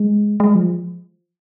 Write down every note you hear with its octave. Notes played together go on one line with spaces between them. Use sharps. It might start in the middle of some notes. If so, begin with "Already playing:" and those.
Already playing: G#3
G#3
F3